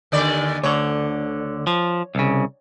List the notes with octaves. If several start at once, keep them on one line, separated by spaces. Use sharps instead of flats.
D#2 D3 D5
D2 D3 C#5
F3
C2 C#3